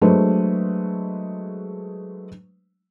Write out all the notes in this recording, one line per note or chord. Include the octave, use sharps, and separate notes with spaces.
F#3 G#3 A3 D4 B4 C5